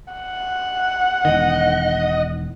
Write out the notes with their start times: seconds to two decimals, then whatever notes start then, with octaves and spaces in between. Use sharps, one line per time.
0.13 F#5
1.25 E1 D#3 D#5